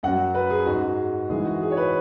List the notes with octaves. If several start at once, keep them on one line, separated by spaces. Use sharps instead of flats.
F#2 F#3 F#5
B4
G#4
G#2 G#3 F#4
G#2 E3 G#3 G#4
F#4
G#4
C#5
B4